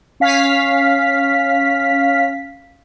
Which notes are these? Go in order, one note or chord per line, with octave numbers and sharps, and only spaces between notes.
C#4 F5 B6